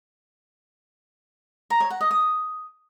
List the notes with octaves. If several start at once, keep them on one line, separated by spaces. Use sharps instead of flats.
A#5
C#5
F#5
D#5
D#6